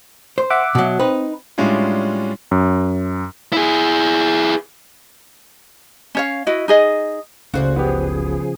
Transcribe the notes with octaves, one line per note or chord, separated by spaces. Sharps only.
C5
E5 F#5 D6
B2 F#3
C4 D#4 B4
A2 G3 G#3 C#4 D4 F4
F#2
E4 G#4
C#4 C#5 F5
E4 F#4 D#5
D#4 G#4 D#5
F#1 C#2 C#3 A3 F#4 C5 D5
C#3 F3 B3 G4 G#4